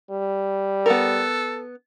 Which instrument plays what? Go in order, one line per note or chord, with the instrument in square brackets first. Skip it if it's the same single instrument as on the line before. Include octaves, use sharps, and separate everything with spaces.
[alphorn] G3
[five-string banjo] B3 A#4 [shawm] A4